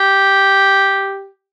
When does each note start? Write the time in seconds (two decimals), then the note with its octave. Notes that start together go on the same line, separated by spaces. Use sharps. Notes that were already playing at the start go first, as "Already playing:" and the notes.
Already playing: G4